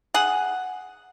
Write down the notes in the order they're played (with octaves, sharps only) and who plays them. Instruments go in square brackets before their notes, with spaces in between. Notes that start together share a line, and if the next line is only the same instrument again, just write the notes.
[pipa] G#4 F#5